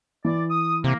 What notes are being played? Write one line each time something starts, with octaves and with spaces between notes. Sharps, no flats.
E3 D5
D#6
C3 A#3